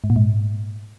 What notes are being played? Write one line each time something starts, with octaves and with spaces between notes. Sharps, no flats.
G#2
A#2
G#2